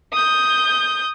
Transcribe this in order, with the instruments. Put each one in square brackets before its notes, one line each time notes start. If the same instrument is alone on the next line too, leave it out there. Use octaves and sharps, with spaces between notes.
[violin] D#6 G6